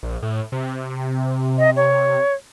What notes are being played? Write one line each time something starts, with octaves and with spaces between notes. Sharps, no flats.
A#1
A2
C3
D#5
C#5